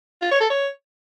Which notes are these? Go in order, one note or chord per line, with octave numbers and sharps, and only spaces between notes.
F4
C#5
A4
C#5